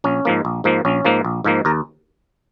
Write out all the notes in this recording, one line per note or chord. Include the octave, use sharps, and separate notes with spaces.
A#1 C#4
G#2 F3 A#3
A#1
G#2 F3 A#3
A#1 C#4
G#2 F3 A#3
A#1
G#2 F3 A#3
D#2 A#4